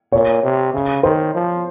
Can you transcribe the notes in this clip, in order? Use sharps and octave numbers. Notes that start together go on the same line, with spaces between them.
A#2 C#5
C3
C#3
D#3 C5
F3